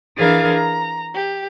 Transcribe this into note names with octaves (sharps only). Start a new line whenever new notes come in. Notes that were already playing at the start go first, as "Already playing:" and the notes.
E3 D4 G#4 A#4 F5 D6
A#5
G4